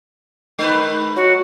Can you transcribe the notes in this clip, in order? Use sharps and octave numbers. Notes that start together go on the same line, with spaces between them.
D#3 G#3 D#4 B4
F#3 F#4